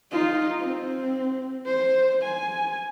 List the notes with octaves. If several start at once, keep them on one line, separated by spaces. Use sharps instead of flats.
D#4 F4
C4
C5
G#5